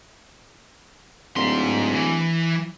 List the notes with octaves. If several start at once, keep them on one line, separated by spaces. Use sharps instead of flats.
D1 G#2 C6
E3